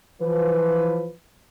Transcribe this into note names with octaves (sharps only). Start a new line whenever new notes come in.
E3 F3 B4